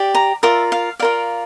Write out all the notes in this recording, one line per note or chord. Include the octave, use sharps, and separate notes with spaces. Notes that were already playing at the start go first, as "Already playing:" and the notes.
Already playing: G4 D5
A#5
F4 A#4 D5 E5
F5
F4 A#4 D5 F5